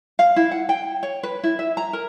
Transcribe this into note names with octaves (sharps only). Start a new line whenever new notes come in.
F5
E4
F#5
G5
C#5
B4
E4
E5
A#5
A#4